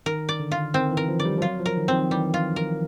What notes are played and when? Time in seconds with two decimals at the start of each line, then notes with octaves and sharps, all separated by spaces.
0.06 D#3 A#4
0.29 D5
0.40 D3
0.51 F4
0.74 D#3 C4
0.91 E3
0.97 A#4
1.08 F3
1.19 D5
1.25 G3
1.38 F3
1.42 F#3 F4
1.60 F3
1.66 A#4
1.77 D#3
1.88 C4
1.93 D#3
2.10 E3 G3
2.34 F4
2.56 A#4